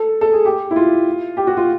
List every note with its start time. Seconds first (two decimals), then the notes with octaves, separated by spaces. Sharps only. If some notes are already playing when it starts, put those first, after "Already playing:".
Already playing: A4
0.21 A4
0.33 G#4
0.45 G4
0.71 E4
0.76 F4
1.37 G4
1.47 F#4
1.57 F4